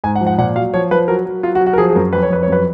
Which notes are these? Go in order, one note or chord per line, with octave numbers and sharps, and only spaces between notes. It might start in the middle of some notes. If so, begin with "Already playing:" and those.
G#2 G#5
F#5
F3
F#5
A#2 F#5
F#3 F5
F3 C#5
F3 B4
F#3 A#4
F#3
F#3 F4
F#4
F#3
F#4
A#4
F3 G#4
G#4
F#2 A#4
F2 B4
C#5
F2 B4
C#5
F#2 B4